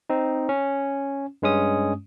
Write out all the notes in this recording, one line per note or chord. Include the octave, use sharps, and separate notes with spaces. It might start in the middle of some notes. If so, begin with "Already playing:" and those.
C4 D#4
C#4
G2 G#3 C#4 D#6